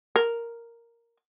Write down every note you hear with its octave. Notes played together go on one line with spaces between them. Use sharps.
A#4